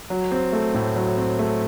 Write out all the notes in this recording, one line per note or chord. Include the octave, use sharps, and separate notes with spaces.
F#3
C4
A3
A2
F#3
C4
A3